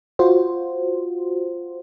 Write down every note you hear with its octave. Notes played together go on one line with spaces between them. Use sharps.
F4 F#4 C5